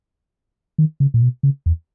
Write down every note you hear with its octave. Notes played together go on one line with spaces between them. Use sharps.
D#3
C#3
A#2
B2
C#3
E2